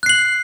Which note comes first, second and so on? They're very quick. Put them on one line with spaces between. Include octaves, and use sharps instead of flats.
F#6 C7 F#7